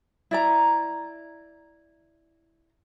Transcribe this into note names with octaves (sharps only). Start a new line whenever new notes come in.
E4 D5 A#5